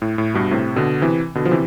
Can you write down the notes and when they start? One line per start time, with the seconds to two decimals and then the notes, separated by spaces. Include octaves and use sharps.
0.02 A2
0.18 A2
0.34 G2 B2
0.51 A2 C3
0.76 B2 D3
1.01 C3 E3
1.35 B2 D3
1.45 F3
1.51 C3 E3